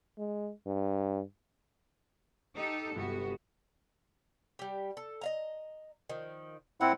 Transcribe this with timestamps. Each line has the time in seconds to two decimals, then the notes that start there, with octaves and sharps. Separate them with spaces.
0.18 G#3
0.66 G2
2.54 D#4 G4 A4
2.95 G1 C3 B3 F#4 G4
4.59 G3 G4
4.97 A4
5.21 D#5 F5 A#5
6.09 D#3 F3
6.81 A#2 C4 E4 F#5